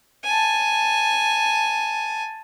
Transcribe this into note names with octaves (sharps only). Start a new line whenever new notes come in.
G#5 A5